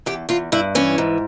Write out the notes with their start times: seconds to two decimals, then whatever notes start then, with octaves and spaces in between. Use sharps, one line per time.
0.06 E2 G4
0.29 E2 F4
0.52 G2 E4
0.75 E3 C#4
0.98 G#2